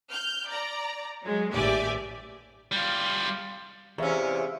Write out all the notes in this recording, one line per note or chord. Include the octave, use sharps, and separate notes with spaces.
F6 G6
D5 A#5
F#3 G#3
A1 D#2 G4 D5 E5 G#5
G3 F4
E2 C3 C#4 G#4 E5 F5